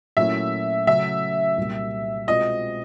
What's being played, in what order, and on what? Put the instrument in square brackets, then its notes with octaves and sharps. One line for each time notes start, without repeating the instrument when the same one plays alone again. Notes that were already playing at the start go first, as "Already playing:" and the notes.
[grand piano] A#2 F#3 A3 C#4 E4 [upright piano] E5
[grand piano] C#3 F#3 A3 C#4 F#4 [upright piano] E5
[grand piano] C2 A#2 G3
[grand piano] B2 G#3 C4 F4 [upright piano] D#5